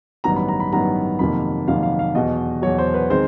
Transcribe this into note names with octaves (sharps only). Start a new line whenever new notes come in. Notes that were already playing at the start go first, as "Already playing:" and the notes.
A1 G2 D#3 F#3 B3 A#5
B5
A#5
B5
A1 G2 D#3 F#3 B3 A#5
F2 C3 D#3 F#3 A#3 B5
F2 C3 D#3 F#3 A#3 F5
F5
F5
E2 B2 F#3 D#5
E2 B2 F#3 C#5
C5
B4
D#3 G#3 C4 C5